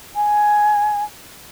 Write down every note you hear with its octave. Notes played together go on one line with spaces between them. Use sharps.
G#5